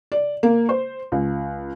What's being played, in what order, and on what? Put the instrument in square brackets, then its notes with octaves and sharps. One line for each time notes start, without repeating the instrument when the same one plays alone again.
[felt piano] D5
A#3
C5
C#2